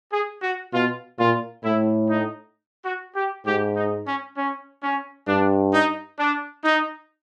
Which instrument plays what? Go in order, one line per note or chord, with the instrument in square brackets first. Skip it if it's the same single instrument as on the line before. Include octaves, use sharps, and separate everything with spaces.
[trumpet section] G#4
F#4
[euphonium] B2 [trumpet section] F4
[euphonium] A#2 [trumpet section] F4
[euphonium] A2 [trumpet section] E4
[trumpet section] D#4
F#4
G4
[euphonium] G#2 [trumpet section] G4
[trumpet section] D#4
C#4
C#4
C#4
[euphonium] G2 [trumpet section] D4
[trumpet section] D#4
D4
D#4